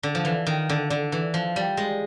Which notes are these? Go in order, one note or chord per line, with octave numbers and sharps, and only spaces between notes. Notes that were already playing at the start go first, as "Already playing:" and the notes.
D3
F3
E3
D#3
D3
D3
E3
F3
G3
G#3